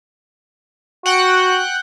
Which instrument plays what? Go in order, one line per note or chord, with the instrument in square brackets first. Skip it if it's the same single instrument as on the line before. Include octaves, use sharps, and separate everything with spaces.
[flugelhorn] F#4 [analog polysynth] F#5 G5 F#6